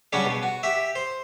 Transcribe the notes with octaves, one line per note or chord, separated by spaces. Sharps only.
C#3 F#3 G3 C#4 D4 G4
B2
F#4
G4 E5
C5